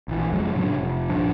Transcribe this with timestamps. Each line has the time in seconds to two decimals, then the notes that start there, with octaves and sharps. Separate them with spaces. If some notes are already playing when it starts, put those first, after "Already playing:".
0.08 A#1 E3
0.32 F#1 F2 F#3 G#3
0.55 A2 C#3 F#3 D4
0.74 F1
1.09 A#1 G2 F3 D4